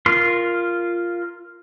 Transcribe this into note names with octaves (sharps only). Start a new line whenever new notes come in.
F4 A#4 C6